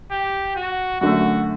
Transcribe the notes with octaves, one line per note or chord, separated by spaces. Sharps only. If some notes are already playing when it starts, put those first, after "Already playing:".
G4
F#4
F#2 D3 A3 F#4